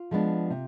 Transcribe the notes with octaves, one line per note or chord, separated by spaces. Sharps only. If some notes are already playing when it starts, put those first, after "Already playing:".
Already playing: F4
F3 G#3 B3 D4
C3